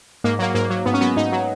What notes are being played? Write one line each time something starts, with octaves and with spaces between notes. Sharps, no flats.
G#2 A#3
F#3 A#3
G#2 A#3
F#3
G#2 B3
C#4
F#3 B3
G#2 D#4
F#3